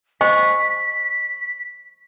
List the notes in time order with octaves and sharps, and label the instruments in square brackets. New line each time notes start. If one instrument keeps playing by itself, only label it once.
[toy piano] C5 D#5 G#5 [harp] C#6 [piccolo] B6